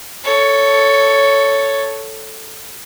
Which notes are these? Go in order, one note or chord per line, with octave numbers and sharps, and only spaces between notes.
A4 C#5